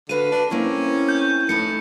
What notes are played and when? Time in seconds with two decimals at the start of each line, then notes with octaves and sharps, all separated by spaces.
0.09 D3 F#4 B4 F5 D#7
0.32 D4
0.51 A#3 C4 C#4 E4
1.09 G6
1.49 A2 A3 D#4 E4 C#7